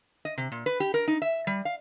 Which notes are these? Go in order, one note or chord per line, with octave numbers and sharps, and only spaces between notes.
D#5
C3
A#2
B4
G4
A#4
D#4
E5
G3
F5